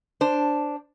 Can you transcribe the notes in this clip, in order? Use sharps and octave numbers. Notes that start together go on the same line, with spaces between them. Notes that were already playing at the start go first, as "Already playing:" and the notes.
D4 C5